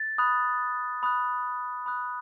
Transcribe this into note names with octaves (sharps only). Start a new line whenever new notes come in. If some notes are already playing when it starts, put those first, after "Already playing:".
Already playing: A6
B5 D#6 F#6
B5 D#6 F#6
B5 D#6 F#6